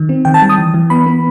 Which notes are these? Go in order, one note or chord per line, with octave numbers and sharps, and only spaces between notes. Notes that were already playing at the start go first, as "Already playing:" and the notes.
Already playing: D#3
C4
D#3 G5
A5
G3
D#6
E3
E3
B3 B5
B3